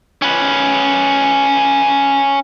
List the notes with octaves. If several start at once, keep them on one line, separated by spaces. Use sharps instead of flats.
C#4 B4